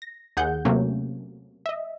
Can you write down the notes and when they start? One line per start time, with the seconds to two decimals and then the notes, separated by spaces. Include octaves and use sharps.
0.02 A#6
0.37 D#2 G#4 F#5 G6
0.65 C3 F#3 A3 A#3 C#4
1.66 D#5 E5